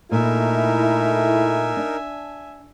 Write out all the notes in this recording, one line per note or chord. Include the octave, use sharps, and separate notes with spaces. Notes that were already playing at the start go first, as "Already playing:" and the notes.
A#2 A3 D#4 E4 A#4 E5 G#5
D4